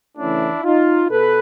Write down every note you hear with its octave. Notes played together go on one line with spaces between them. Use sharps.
C#3 E3 A3 C#4 D4 E4
D#4 F4
B2 A4 B4